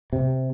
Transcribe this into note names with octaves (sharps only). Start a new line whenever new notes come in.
C3